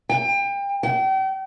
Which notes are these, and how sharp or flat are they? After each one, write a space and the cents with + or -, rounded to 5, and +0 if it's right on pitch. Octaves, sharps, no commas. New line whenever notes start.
G5 +30
G5 -40